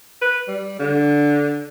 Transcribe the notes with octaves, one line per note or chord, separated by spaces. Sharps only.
B4
G3
D3